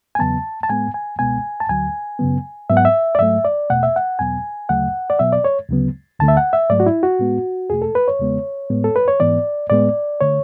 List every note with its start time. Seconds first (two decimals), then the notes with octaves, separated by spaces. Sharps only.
0.15 G#5
0.19 E2 C#3 F#3 B3 A5
0.63 A5
0.69 A2 G#3 B3 G#5
0.94 G#5
1.19 C#2 B2 G#3 B3 G#5
1.60 A5
1.69 D2 D3 F#3 G#5
2.19 F#2 C#3 F#3 B3
2.70 G#2 F#3 B3 E5
2.77 F#5
2.85 E5
3.15 D5
3.19 G#2 F#3 A3 E5
3.45 D5
3.70 E2 B2 A3 F#5
3.83 E5
3.96 F#5
4.19 E2 B2 F#3 B3 G#5
4.69 D2 C#3 F#3 A3 F#5
5.10 D5
5.19 B2 F#3 B3 E5
5.33 D5
5.44 C#5
5.69 D2 C#3 F#3 B3
6.19 D2 D3 A3 A5
6.28 E5
6.37 F#5
6.53 E5
6.70 G#2 F#3 A3 D5
6.80 F#4
6.86 E4
7.03 F#4
7.19 A2 G#3 B3
7.70 E2 B2 A3 G#4
7.82 A4
7.95 B4
8.08 C#5
8.19 E2 C#3 G#3 B3
8.70 A2 G#3 B3
8.84 A4
8.96 B4
9.08 C#5
9.20 G#2 E3 B3 D5
9.70 A2 G#3 B3 D5
10.21 D3 A3 C#5